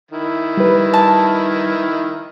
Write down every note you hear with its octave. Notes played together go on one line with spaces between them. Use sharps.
D#3 E4
G3 B4
A5